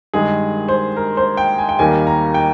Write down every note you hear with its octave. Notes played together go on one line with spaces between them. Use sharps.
G2 D#3 G#3 G#4
C5
A#4
C5
G5
G#5
G5
D#2 D#3 G3 A#3 G#5
A#5
G5